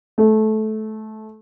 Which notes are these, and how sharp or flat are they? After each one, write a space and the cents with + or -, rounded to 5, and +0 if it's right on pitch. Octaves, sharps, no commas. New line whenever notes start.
A3 -20